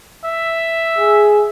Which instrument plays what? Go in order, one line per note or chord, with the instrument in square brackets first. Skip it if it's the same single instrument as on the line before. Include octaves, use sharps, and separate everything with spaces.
[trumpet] E5
[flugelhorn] G#4